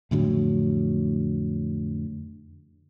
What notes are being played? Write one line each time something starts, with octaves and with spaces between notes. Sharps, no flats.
F2 A2 D3 F#3